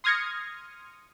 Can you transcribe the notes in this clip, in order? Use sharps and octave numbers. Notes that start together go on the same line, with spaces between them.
C6 D#6 F6 G#6 A#6 C#7